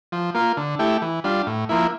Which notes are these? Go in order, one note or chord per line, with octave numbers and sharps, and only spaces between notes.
F3
A#3 F4
D3
A3 E4 G4
E3
G3 D4 F4
A2
F3 A#3 E4